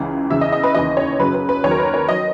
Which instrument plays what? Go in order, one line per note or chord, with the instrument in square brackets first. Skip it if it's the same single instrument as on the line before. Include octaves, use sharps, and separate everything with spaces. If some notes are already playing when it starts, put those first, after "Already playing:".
Already playing: [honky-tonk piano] C#2 C#3 E3
E2 C#3 E3 E5
D#5
D#5
B4
D#2 C#3 E3 D#5
C#5
F#2 C#3 F#3 B4
B4
B4
D#2 D#3 F#3 C#5
A#4
B4
C#5
D#3 F#3 D#5